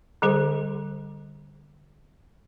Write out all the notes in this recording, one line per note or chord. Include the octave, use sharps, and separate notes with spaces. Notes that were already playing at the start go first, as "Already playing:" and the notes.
D3 G3 G#4 C5